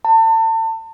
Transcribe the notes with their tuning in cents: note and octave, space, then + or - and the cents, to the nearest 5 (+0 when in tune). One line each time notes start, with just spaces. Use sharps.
A5 +35